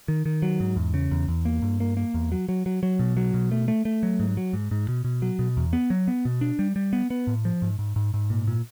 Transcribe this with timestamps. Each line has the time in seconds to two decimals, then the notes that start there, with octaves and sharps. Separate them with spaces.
0.08 D#3
0.26 D#3
0.42 F#3
0.60 G#2
0.76 E2
0.94 C#3
1.11 E2
1.28 E2
1.45 A#3
1.62 G2
1.80 A#3
1.97 A#3
2.14 E2
2.32 F#3
2.49 F#3
2.66 F#3
2.83 F#3
2.99 B2
3.17 F#3
3.34 B2
3.52 A3
3.68 A3
3.85 A3
4.03 F#3
4.20 G#2
4.37 F#3
4.53 G#2
4.71 G#2
4.88 B2
5.04 B2
5.22 F#3
5.39 B2
5.57 E2
5.73 B3
5.90 F#3
6.08 B3
6.25 B2
6.41 D4
6.59 G3
6.76 G3
6.93 B3
7.10 B3
7.27 A2
7.45 F3
7.62 G#2
7.79 G#2
7.96 G#2
8.14 G#2
8.30 A#2
8.47 A#2